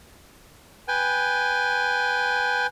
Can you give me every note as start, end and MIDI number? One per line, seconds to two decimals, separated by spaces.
0.88 2.67 71
0.88 2.67 79
0.88 2.67 80